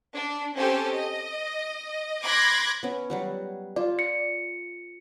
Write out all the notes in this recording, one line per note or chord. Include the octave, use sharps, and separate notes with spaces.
D4
C4 C#4 G4 A4 C5
D#5
B5 C6 D6 F#6 G#6 A#6
B3 C#4
F#3 G3 F#4
F4 D5
C#7